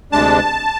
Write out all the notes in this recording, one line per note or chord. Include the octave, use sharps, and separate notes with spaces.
D2 C3 G#3 D4 A5